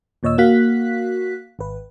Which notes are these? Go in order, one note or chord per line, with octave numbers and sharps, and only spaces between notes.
D#2 A#2 C#5 D#5 E6
A#3 F#4 F5 F#6 B6
G#1 B4